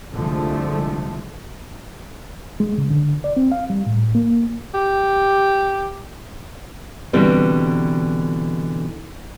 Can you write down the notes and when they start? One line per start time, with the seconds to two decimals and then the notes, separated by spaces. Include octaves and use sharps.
0.14 C2 D3 F3 G#3 A3
2.60 G#3
2.78 C#3
2.90 D3
3.24 D5
3.37 C4
3.52 F5
3.70 G3
3.86 A2
4.15 A#3
4.74 G4
7.13 B2 D3 E3 G3 C4